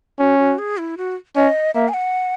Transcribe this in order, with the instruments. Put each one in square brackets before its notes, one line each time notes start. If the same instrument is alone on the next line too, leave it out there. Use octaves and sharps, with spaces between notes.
[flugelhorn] C#4 [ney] F#4
[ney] F#4
G#4
E4
F#4
[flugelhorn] C#4 [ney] D#5
[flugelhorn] A#3 [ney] E5
[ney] G#5
F#5